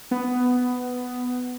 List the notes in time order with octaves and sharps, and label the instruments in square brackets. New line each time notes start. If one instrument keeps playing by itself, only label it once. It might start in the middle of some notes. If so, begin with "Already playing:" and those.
[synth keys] B3